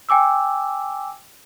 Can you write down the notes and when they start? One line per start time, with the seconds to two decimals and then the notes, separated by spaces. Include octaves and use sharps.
0.09 G5 G#5 D6 E6